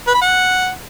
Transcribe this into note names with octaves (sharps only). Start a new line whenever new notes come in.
B4
B5
F#5